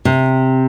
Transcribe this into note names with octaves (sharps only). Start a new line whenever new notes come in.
C3